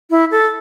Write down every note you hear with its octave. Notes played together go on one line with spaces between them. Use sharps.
E4
A4